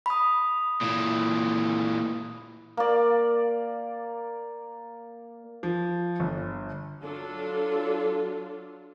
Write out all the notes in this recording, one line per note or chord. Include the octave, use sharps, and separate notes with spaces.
B5 D#6
A#2 E3
A#3 D5
F3
G1
F#3 D4 F4 A4